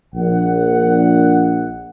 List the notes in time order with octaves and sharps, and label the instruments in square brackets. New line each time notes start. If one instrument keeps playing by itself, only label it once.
[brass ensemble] A#1 F#5